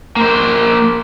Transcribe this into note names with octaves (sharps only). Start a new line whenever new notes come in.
A#3 C5